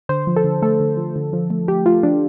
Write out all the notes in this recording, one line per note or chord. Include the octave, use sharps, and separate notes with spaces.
D3 C5
F3
A4
D3
A3 A4
D3
F3
D3
F3
A3
A3 G4
A3 F4
F3 D4